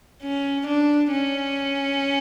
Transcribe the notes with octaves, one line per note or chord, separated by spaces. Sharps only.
C#4
D4
C#4